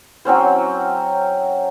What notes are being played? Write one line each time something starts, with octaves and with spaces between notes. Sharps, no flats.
F#3 C4 C#4 C5